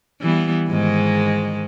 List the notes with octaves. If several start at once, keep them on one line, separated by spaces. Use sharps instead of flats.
E3 G3 B3
G#2 D#3 G#3